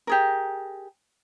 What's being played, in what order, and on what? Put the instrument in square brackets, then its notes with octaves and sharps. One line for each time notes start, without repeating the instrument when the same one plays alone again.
[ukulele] G4 G#4 A#4